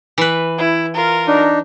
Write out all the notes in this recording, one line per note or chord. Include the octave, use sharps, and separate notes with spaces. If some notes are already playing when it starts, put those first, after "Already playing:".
E3 B4
E4
F4 A#4
D4 D#4